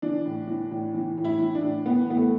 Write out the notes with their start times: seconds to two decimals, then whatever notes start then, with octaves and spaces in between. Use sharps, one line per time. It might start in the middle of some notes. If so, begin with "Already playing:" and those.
0.02 E3 D4
0.26 A2
0.48 E3
0.71 A2
0.94 E3
1.17 A2
1.25 E4
1.39 E3
1.55 D4
1.63 A2
1.86 E3 B3
2.09 A2 B3
2.17 A3